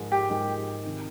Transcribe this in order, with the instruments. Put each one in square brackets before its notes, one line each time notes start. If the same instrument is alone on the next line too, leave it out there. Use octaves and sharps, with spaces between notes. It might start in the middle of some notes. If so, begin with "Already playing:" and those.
Already playing: [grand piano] G#2 F3 G#3 D#4 A#4
[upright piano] G4
[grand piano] G#2 F3 G#3 D#4 A#4
C3 D#3